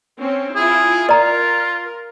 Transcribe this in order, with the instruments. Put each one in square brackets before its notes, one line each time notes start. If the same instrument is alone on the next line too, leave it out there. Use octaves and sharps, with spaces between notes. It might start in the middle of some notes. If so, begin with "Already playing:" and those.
[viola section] C4 C#4
[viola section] E4 F4 [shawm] G#4
[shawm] F4 [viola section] A#4 [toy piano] D5 A#5